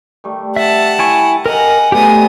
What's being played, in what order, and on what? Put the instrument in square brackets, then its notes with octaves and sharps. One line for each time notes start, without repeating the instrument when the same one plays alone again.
[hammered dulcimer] D#3 G3 A3
[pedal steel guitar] E5 [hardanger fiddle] F#5 A5
[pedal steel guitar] E4 G#5 C#6
[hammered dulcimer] G#4 [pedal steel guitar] A#4 A#5 [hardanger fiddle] D#5 F#5
[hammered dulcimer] F3 G3 G#5 [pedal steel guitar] A3 G4 [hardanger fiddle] B3 D#6